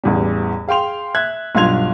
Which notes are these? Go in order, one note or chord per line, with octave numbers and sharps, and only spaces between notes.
A1 E2 G3
G#4 F5 G5 C6 F7
E5 F#6 G#6
B1 G2 F4 C6 G#6 F7